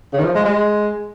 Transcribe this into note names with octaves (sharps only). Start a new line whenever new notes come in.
C#3
D#3
F3
G#3
G#3